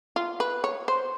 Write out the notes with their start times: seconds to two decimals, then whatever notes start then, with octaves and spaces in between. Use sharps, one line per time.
0.16 F4
0.40 B4
0.64 C#5
0.88 C5